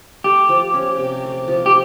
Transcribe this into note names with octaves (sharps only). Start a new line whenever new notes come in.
A3 G4
F3
C#4
C3
A3
F3
G4